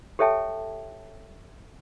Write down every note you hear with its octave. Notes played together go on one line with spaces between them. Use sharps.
G4 A4 C#5 E5 G5 A5